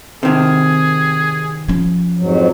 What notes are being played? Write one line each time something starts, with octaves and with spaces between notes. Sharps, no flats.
C3 D#3 G#4
F3 C#4
F2 G#2 F#3